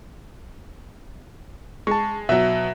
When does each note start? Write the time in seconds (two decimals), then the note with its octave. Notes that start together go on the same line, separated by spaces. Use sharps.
1.87 G#3 A5 C#6
2.29 B2 F#3 E5